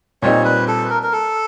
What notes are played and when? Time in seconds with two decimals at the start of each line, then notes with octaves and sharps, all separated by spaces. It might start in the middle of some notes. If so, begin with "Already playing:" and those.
0.22 A#2 G3 C4 D#4 C#5
0.45 B4
0.68 A4
0.85 B4
0.90 A#4
1.03 A#4
1.12 A4